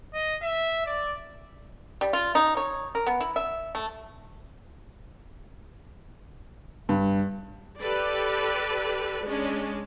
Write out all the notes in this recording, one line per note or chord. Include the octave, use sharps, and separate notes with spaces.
D#5
E5
D5
G3
F4
D#4
C#5
A#4
B3
E4
E5
A3
G2
G4 A4 B4 D5
G#3 C#4 D4